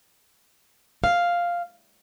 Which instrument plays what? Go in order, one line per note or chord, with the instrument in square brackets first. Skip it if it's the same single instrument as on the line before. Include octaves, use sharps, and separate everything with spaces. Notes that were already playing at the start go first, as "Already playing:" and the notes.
[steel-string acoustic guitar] F5